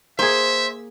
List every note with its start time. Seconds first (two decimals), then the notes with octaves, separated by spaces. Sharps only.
0.19 A#3 G#4 C5 E5